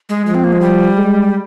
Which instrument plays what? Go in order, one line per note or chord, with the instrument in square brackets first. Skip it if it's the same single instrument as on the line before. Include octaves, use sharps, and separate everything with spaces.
[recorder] G#3
[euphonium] F3 [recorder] G#3
[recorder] C4
A#3
G#3
G3
[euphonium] G#3